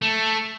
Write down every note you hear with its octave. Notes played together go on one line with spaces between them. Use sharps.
A3